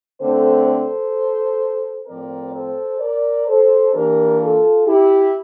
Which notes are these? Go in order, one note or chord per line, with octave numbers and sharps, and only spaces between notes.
D3 A3 C4 A4 C5
A4 C5
A2 F3 C4 A#4 D5
A4 C5
A#4 D5
A4 C5
E3 A#3 D4 G4 A#4
F4 A4
E4 G4